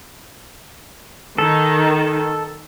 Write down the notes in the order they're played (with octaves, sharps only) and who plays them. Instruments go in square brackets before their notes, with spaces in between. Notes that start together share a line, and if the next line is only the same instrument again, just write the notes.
[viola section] D#3 [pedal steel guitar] A4